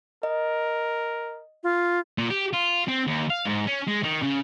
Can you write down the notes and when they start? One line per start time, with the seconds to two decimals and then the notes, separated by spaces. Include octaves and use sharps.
0.23 A#4 D#5
1.63 F4
2.18 A#2
2.30 G4
2.53 F4
2.88 C4
3.07 D#2
3.30 F5
3.46 G#2
3.67 C#4
3.87 G#3
4.03 D#3
4.22 C#3